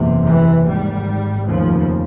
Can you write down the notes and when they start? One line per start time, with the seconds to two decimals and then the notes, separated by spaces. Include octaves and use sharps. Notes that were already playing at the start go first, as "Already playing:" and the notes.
Already playing: F#1 E2 C3
0.25 E3
0.65 G#1 G#2 G3
1.46 F1 D#2 C#3 F3